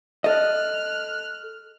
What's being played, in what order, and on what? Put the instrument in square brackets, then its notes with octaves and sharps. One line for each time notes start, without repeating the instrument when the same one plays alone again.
[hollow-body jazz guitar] A4 D#5 [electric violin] F6 F#6